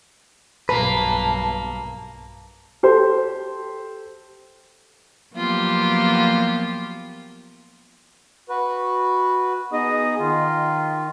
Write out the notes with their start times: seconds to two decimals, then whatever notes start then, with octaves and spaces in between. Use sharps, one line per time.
0.69 B1 G2 A#3 B4 A5
2.83 G4 A4 C5
5.34 F3 F#3 A#3 B3 F4 G4
8.49 F#4 B4
9.73 B3 D#4 G#4 D#5
10.19 D#3 F4